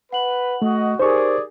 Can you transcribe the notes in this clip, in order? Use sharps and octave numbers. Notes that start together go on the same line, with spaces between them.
B4 F#5 F#7
A3 F#4 D#5
D#4 G4 G#4 A#4 C5 D5 C#6